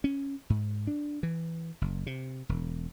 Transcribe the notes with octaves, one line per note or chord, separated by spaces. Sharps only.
C#4
G#2
D4
E3
F#1
C3
E1